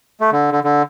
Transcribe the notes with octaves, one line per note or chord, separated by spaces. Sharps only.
A3
D3
D3
D3